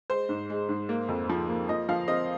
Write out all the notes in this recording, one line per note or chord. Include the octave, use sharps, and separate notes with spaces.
G#3 C5
G#2
G#3
G#2
A#3
F2
F3
A#3
F3 D#5
F3 F5
C4 D#5